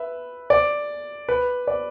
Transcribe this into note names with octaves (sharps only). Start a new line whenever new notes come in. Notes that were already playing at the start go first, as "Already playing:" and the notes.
Already playing: B4 E5
D5
B4
D5